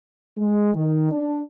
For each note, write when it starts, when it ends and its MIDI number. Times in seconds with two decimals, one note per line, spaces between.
0.38 0.74 56
0.74 1.09 51
1.12 1.40 62